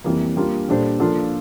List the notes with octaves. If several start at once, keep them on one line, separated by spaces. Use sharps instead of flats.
F2 E3 G3 A#3
G3 A#3 D4 F4
A#2 G3 D4 A4 C5
F3 A#3 D4 F4 A4